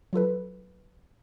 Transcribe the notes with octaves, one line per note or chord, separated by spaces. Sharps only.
F#3 F4 A4 B4